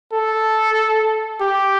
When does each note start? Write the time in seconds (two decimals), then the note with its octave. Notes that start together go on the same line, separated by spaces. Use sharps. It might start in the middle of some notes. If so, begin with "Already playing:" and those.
0.13 A4
1.41 G4